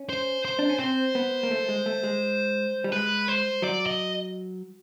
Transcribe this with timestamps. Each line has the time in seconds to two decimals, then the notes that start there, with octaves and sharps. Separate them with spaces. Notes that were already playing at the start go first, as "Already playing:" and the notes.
Already playing: C#4
0.09 C5
0.45 C5
0.59 D4
0.69 C#4
0.79 C4 C5
1.15 B3
1.43 A#3
1.51 A3
1.69 G#3
1.86 A3
2.03 G#3
2.84 G3
2.92 G#3 B4
3.28 C5
3.62 F#3 D5
3.86 D#5